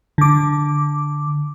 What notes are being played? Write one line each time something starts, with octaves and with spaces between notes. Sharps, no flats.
D3 D6